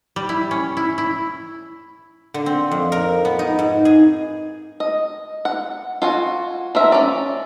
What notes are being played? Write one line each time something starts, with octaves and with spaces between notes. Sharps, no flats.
G3
E4
C#4
E4
E4
D3
C4
F2
A#4
B3
D#4
G#2
G#4
D#5
F#5
F4 F#4 G#5
F3 A#4 E5
C#4 D5